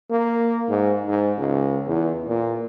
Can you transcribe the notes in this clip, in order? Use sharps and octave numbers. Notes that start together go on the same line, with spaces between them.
A#3
G#2
G#2
C#2
E2
A#2